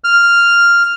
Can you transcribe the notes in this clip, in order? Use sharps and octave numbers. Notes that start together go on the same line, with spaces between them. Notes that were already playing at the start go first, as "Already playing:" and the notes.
F6